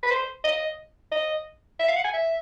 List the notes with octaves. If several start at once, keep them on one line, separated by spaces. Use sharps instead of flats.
B4
C5
D#5
D#5
E5
F5
F#5
G#5
E5